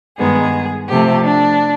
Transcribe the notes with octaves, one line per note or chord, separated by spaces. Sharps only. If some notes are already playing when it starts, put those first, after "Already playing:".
G2 D#3 G#3 B3 G#4
C3 F3 A3 C4 G4
D4